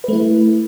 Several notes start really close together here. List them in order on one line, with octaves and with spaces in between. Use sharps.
B4 A3 E4